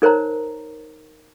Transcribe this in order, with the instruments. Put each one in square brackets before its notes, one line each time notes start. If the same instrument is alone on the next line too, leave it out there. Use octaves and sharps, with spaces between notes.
[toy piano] D#4 A#4 C5 C#5 A#5